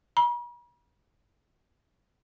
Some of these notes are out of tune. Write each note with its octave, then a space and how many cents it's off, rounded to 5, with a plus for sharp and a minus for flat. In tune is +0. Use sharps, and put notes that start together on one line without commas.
B5 -45